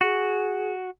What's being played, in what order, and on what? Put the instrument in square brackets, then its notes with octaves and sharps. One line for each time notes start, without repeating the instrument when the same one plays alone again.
[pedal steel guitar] F#4 [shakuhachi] G#4